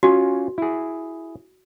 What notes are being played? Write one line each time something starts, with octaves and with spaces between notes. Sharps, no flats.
C#4 F4 F#4 G#5
E4 G#4